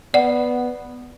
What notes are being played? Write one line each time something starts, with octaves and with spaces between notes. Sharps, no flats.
B3 D5 F#5